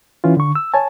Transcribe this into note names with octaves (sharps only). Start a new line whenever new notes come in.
E3 C#4 F4
D3 C#6
E6
C#5 G#5 A5